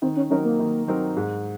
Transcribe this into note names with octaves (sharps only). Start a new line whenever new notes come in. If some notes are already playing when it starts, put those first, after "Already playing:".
D#3 C4
C#4
F#3 C4 C#4 D#4 A#4
A#3
D#3
F#3 C4 D#4 A#4
G#2